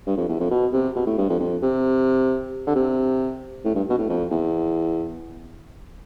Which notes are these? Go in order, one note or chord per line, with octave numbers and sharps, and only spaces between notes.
G2
F2
E2
F2
B2
C3
B2
A2
G2
F2
F2
C3
D3
C3
A2
G2
B2
A2
F2
E2